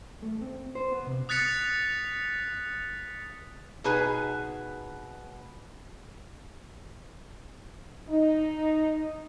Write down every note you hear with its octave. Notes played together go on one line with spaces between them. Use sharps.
A3
C4
C5
B3
C3
D#6 F#6 A6 B6 C#7 F7
B2 D#4 G#4 B4 G#5
D#4